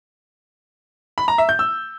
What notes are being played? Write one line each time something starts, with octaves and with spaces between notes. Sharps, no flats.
B5
A#5
E5
G6
E6